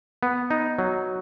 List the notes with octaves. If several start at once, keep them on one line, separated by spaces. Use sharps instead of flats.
B3
D#4
F#3